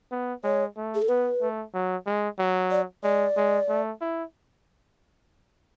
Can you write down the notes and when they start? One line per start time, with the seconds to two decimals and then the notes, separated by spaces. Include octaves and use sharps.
0.11 B3
0.44 G#3 C#5
0.77 A3
0.95 G#4
1.02 A4
1.09 B3 B4
1.42 A3
1.74 F#3
2.06 G#3
2.39 F#3
2.71 D5
3.03 G#3 D5
3.36 G#3
3.69 A3
4.01 E4